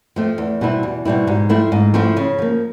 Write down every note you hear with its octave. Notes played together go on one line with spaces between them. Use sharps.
F3 A3 C4
E2
B2 G3 C4 E4
E2
B2 G3 C4 E4
G#2
F3 A3 C4 E4
G#2
F3 A3 C4 E4
C#3
F3 A#3